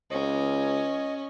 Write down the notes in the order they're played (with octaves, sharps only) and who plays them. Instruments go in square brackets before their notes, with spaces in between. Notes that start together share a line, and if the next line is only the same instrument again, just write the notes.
[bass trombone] C#2 [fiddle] C#4 [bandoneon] D#5